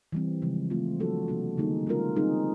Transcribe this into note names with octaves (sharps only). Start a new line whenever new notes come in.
E3 G3 C4
C#3 F3 G#3
A3 C4 F4
F#3 A#3 D4 F#4 A4
C3 F3 A#3 D4 F#4
D3 G3 A#3 D#4 G#4
G#3 C#4 F4 A#4
G3 C4 D#4 G#4